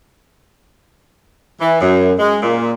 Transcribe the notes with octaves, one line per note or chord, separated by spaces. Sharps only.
E3
F#2
G#3
A#2